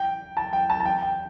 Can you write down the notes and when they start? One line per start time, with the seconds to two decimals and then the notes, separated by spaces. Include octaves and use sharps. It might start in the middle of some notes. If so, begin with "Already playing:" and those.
Already playing: G5
0.37 A5
0.53 G5
0.70 A5
0.80 A5
0.85 G5
1.02 G5